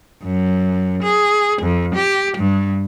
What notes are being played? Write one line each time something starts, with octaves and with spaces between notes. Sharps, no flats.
F#2
G#4
F2
G4
G2